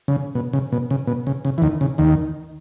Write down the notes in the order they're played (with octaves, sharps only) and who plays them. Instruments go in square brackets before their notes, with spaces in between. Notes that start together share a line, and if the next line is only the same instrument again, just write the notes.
[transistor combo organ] C#3
B2
C#3
B2
C#3
B2
C#3
C#3
E3
D#2 D#3
C#3
D#2 D#3